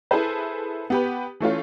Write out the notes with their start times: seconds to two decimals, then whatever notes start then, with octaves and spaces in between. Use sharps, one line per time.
0.11 E4 G#4 A4 B4 C5
0.90 B3 G4 B4
1.40 E3 A3 C#4 F4